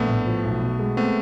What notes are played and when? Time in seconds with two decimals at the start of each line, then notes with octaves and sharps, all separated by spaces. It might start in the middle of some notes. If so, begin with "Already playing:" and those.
Already playing: A#1 A3 B3
0.08 A2
0.27 F3
0.44 B1
0.62 B2
0.79 G#3
0.97 A3 B3 C4